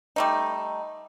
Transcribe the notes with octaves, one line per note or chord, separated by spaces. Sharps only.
G3 A3 D#4